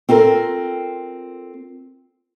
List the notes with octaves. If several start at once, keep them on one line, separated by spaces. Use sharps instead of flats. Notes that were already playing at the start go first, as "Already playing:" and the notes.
C4 F4 A4 A#4